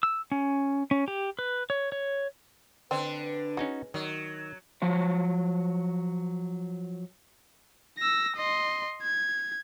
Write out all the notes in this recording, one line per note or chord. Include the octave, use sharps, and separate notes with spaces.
E6
C#4
C#4
G4
B4
C#5
C#5
D3 C4 D4 B4
G#3 C#4 D#4 F#4
D#3 F#3
F3 F#3 C#5
E6 A#6
D#5 C6
G#6